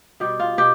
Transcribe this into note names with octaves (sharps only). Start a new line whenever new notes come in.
B2 G3 G4
F4
B2 G4